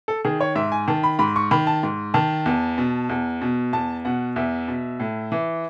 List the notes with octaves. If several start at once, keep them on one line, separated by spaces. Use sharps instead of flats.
A4
D#3 G#4
C#5
G#2 E5
G#5
D#3 A5
B5
G#2 B5
C#6
D#3 B5
A5
G#2
D#3 A5
E2
B2
E2
B2
E2 A5
B2 F#5
E2 E5
B2
A2
E3